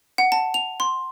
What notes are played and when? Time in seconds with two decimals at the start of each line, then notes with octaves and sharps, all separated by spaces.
0.18 F#5
0.32 A5
0.54 F7
0.80 C6